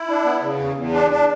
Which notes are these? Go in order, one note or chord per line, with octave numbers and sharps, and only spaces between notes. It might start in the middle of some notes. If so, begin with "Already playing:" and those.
Already playing: E4
D4
B3
C#3
E2
E2
D4
D4